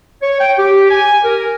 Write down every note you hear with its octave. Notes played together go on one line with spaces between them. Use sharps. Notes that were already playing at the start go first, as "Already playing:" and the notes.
C#5
G5
G4
G#5
A#4